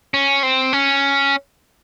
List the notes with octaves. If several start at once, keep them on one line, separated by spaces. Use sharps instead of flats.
C#4
C4
C#4